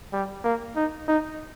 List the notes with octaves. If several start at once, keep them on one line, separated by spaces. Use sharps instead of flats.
G3
A#3
D#4
D#4